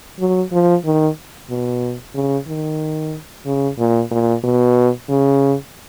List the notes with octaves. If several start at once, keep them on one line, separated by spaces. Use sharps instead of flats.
F#3
F3
D#3
B2
C#3
D#3
C#3
A#2
A#2
B2
C#3